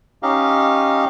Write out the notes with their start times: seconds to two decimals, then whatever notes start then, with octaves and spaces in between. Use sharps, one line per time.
0.23 C#4 D#4 G4 D#5 F5